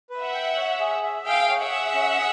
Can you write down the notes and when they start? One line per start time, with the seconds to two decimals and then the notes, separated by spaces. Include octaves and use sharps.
0.10 B4
0.21 E5 F#5
0.34 G5
0.56 C#5
0.80 G#4
1.03 E5
1.26 G#4 F5 G5
1.49 C#5
1.60 E5 F#5
1.71 G#4
1.94 C#4
2.17 G#4